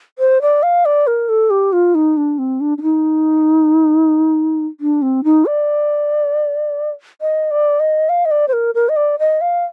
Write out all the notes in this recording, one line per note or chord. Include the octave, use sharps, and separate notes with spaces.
C5
D5
F5
D5
A#4
A4
G4
F4
D#4
D4
C4
D4
D4
D#4
D4
C4
D#4
D5
D#5
D5
D#5
F5
D#5
D5
C5
A#4
A#4
D#5
D5
D#5
F5